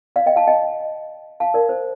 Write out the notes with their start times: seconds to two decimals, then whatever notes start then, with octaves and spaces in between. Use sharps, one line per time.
0.16 D5 F5
0.26 D#5 G5
0.36 F5 A5
0.47 D#5 G5
1.40 F5 A5
1.54 A#4 D5
1.69 C5